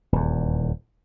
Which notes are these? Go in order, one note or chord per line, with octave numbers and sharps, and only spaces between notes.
D#1 E2